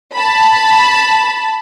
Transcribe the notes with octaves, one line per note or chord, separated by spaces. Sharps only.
A5 B5